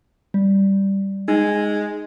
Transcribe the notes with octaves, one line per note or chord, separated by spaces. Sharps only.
G3
G#3 D#4 G#5